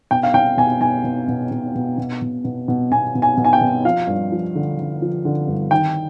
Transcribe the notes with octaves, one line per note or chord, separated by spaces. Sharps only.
B2 G5
F5
B2 G5
B2 G#5
B2 G#5
B2
B2
B2
B2
B2
B2
B2
B2
B2 G#5
B2
G#5
B2
G#5
G5
B2
F3 F5
G2
F3
D3
D3
F3
D3
G2
D#3 G5